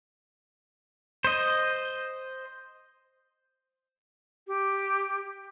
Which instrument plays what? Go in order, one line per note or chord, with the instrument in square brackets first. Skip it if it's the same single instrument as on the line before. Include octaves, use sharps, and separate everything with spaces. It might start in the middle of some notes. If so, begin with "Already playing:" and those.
[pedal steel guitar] C5 D#5
[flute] G4